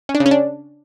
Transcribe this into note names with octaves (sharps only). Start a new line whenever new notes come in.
C#4
D4
C#3
C#4
D4